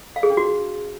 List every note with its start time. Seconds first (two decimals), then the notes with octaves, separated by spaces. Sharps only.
0.16 F5
0.23 G#4
0.30 D4
0.37 F#4